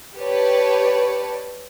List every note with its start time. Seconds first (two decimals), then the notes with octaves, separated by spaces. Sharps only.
0.18 G4 B4 C#5 D5 A5